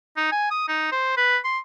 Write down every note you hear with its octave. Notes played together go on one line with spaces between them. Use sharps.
D#4
G#5
D#6
D#4
C5
B4
C6